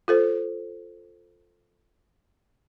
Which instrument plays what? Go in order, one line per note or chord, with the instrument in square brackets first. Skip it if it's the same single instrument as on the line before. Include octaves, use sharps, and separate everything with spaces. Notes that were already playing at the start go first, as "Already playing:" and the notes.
[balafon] F4 A4 C5